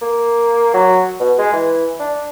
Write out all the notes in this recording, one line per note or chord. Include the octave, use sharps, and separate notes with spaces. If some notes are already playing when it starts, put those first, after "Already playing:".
A#3
F#3
B2
G#3
E3
D4